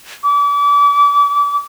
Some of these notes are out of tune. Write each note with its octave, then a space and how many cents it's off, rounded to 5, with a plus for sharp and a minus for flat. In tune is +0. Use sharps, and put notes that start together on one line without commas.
D6 -35